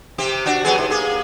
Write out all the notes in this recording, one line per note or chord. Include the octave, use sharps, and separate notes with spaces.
C3 C4 G4
D4 F#4
F#3 B3 G#4
G#2
A#3 G#4